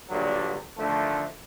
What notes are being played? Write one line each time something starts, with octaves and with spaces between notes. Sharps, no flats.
A#1 G2 A#2 D3 F#3
D3 D#3 F3 A3